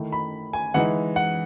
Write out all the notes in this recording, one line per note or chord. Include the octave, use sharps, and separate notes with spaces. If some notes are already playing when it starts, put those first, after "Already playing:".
Already playing: D#3 A3 E4
B5
G#5
E3 G#3 D#4 F#5
F#5